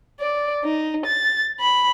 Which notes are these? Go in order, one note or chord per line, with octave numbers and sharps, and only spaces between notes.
D5
D#4
A6
B5